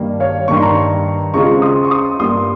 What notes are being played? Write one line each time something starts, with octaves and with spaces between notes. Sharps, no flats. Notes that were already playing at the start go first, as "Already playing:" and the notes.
Already playing: G2 D#3 G3 A#3
C#5 F5
G2 D#3 A#3 C#6
C6
A#5 C#6
C#3 G#3 C4 F4 A#5 C#6
C6 D#6
C#6
C6 D#6
G2 G3 A#3 C6 D#6